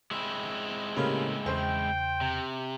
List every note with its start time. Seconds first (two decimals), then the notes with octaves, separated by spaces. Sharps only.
0.11 G#3 C4 E4 B5 E6
0.96 A2 C#3 A#3 G4 B5 F6
1.46 E2 C#3 C5 G5
2.21 C3